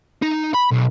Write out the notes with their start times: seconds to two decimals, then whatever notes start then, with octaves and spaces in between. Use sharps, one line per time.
0.23 D#4
0.54 B5
0.72 B1